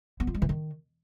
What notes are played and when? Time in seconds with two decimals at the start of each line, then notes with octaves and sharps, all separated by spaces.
0.20 B3
0.27 F4
0.35 G#3
0.42 E3
0.49 D#3